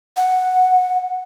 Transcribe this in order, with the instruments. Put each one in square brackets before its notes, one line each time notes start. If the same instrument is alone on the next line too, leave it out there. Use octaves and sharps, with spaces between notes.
[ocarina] F#5